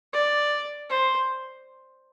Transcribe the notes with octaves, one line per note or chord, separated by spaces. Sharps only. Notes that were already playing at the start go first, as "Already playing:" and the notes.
D5
C5